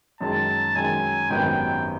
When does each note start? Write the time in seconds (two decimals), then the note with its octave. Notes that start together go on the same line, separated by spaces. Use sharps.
0.21 F#2 D#3 G#3 A5
0.75 F#2 D#3 G#3 G#5
1.30 G#1 F#2 D#3 G3 B3 G5